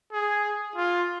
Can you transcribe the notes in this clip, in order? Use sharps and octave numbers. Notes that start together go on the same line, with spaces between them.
G#4
F4